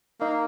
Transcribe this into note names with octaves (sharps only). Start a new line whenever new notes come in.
A#3 D#4